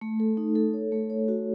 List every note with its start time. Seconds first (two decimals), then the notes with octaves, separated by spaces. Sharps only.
0.01 A3
0.20 A4
0.37 D#4
0.55 A4
0.74 C#5
0.92 A3
1.10 C#5
1.28 F#4